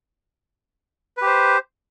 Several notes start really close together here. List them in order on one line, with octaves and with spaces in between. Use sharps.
B4 G4 C5